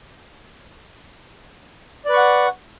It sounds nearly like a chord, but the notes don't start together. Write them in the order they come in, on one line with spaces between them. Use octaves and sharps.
D5 B4 C#6 F#5